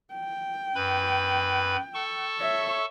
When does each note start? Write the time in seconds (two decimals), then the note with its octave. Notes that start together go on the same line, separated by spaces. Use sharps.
0.14 G5
0.75 F#2 B4 B5
1.94 A4 A5 C#6
2.39 C#5 E5